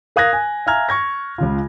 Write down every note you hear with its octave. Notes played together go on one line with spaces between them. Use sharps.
A#4 F5 D#6 F#6 G#6 A#6
G#5
E5 F5 G#5 A#5 F6 G#6
C#6 G#6 A#6
C#2 C#3 F4